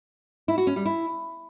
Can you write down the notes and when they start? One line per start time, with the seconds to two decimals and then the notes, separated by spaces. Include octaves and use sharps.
0.48 E4
0.58 F#4
0.67 C#4
0.76 G3
0.85 E4